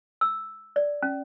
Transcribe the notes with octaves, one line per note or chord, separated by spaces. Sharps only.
E6
D5
C#4